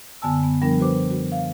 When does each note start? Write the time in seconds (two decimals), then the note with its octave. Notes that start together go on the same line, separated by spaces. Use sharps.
0.22 F#2 D3 B3 G#5 A5 E6
0.43 B3
0.61 F3 G3 B3 D4 A#4
0.80 F#4 B4 C5 D6
1.11 F#4
1.32 F5